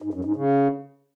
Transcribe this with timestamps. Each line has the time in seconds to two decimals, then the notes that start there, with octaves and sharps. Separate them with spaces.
0.02 G#2
0.13 F#2
0.25 G#2
0.36 C#3